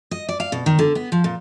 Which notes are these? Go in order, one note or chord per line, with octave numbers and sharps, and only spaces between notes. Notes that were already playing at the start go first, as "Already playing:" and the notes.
D#5
D5
F5
B2
D#3
D3
B3
F3
A#2